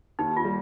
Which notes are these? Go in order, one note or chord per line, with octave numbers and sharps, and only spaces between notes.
D#2 D#4
F4
G3